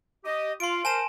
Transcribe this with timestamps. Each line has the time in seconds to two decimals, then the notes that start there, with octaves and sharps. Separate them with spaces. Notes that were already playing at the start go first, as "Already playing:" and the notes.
0.24 G4 D#5
0.60 F4 F5 C6 D7
0.85 A#4 C5 G#5 A5 E7